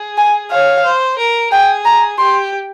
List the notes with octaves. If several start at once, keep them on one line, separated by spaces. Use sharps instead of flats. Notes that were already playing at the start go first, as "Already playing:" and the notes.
Already playing: G#4
G#5
C#5 F5
C5
A#4
G#4 G5
A#5
G4 C6